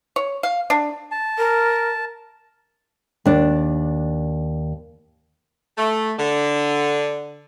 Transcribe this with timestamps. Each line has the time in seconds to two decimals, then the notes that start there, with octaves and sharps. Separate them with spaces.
0.16 C#5
0.43 F5
0.70 D4
1.11 A5
1.38 A#4
3.26 D#2 D4
5.78 A3
6.19 D3